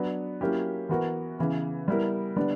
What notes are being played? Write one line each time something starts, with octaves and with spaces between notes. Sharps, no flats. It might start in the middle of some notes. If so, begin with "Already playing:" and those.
Already playing: F#3 B3 D4
F#3 A#3 C#4 E4 G4
E3 B3 F#4 A#4
C#3 E3 B3
G3 B3 E4 A#4
D3 G3 B3 D4